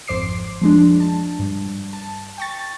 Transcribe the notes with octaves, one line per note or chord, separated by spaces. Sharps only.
G#1 F2 C5 D6 C7
F3 G#3 D4
A5
G2
A5
G5 C#6 A6